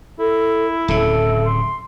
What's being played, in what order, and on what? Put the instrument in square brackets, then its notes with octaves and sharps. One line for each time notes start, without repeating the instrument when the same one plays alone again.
[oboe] E4 [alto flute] A4
[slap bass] D1 C#3 [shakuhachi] A4 [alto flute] E5
[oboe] C6